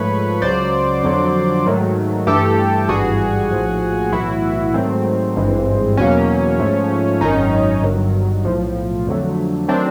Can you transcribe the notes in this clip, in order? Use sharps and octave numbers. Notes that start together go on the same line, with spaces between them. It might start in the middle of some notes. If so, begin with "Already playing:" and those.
Already playing: G#2 F3 A3 B4 C#5
C#2 C#3 F#3 C5 D5
F2 D3 F#3
G#2 D#3 F#3 A3
G2 E3 A3 G4 A4
G#1 G2 E3 G3 F#4 G#4
A#1 A2 F3
B1 A2 E3 E4 F#4
G#2 D#3 F#3 A3 C4
G#1 G2 E3 G#3
E2 B2 F#3 A#3 C#4
G#2 F3 A3
G#1 F#2 D#3 C#4 D#4
G1 G2 D#3 F#3
B1 A2 F3
F2 D3 F#3 A3
D#3 F#3 A3 C4 D4